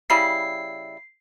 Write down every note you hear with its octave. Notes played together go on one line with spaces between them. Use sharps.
C#3 G3 E4 C7